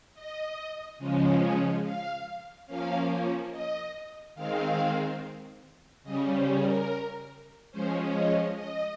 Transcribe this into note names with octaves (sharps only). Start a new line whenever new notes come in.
D#5
C#3 F3 G#3 C#4
F5
F3 A#3 C#4 F5
D#5
D#3 G#3 C4 F5
C#3 G3 C#4 D#5
C5
A#4
F3 G#3 C#4 C5
D#5
D#5